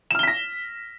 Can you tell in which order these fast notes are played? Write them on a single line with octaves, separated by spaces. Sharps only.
E7 F6 G7 B6 A#6